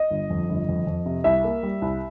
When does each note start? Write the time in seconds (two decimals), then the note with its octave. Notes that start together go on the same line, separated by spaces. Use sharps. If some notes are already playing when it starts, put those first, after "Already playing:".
Already playing: D#5
0.10 G1
0.30 F2
0.49 G1
0.69 F2
0.87 F2
1.06 C3
1.24 C2 E5
1.44 A#3
1.63 G3
1.82 C2